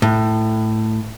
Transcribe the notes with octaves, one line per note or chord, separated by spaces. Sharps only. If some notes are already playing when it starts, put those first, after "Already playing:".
A2